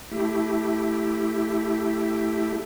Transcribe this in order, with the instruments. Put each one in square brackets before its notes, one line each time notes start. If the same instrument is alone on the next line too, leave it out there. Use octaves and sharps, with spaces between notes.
[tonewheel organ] A3 E4 G4